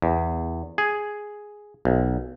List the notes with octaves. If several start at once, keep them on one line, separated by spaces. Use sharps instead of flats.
E2
G#4
B1